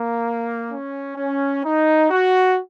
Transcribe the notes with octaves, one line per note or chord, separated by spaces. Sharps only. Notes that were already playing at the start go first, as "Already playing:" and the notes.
Already playing: A#3
C#4
C#4
D#4
F#4